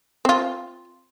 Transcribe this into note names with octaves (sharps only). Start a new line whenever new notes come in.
C4 F4